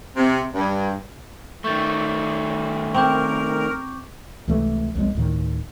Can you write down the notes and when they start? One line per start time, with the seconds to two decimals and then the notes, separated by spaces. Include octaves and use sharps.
0.17 C3
0.54 G2
1.64 D#3 A3 C#6 G6 A6
2.94 C4 A#4 C#6 D6 G6
4.47 C#2 C3 E3 A3
4.95 B1 F2 G#3
5.15 D2 A2 D#3